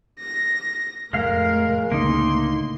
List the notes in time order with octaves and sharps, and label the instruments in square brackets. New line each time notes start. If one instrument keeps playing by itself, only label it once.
[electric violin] A#6
[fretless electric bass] F1 A3 [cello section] A2 [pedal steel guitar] G#3 F5 [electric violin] A#4
[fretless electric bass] C#2 D3 [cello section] A2 [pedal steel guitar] A#3 D#4 [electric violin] C6